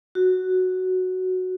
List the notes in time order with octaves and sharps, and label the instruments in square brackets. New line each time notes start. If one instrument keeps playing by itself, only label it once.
[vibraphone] F#4